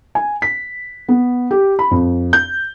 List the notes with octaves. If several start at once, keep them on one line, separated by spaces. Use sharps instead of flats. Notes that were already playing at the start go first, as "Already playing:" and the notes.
G#5
B6
B3
G4
B5
F2
G6